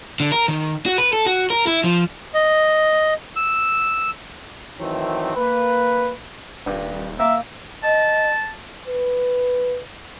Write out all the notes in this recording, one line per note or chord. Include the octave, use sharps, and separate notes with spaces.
D3
A#4
D#3
F#4
B4
A4
F#4
A#4
E4
F3
D#5
E6
D#3 E3 F#3 A3 C4
A#3 B4
D#1 G2
A#3 E5
D#5 A5
B4